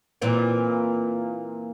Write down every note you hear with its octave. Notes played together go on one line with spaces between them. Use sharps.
A#2 E3 C4